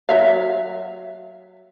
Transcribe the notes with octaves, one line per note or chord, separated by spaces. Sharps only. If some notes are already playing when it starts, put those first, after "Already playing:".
F#3 E5 F5